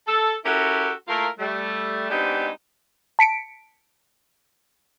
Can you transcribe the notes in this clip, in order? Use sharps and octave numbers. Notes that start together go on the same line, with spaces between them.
A4
C#4 E4 F#4 G4 A4 A#4
A3 A#3 E4 F4 A#4
G3 A3
G#3 B3 C4 D4 D#4 G4
A5 B6 C#7 D7